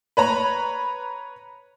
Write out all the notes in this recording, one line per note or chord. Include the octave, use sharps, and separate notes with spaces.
B4 C#5 A#5 B5